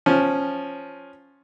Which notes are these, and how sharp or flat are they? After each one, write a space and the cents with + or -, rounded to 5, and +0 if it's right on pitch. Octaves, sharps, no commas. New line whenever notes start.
F3 +0 C#4 -5